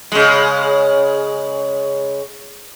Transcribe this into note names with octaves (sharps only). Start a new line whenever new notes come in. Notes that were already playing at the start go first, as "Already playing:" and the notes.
C#3 G#3